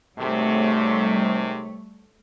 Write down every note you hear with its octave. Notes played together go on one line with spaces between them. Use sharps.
G#1 C3 G3 A3 C#5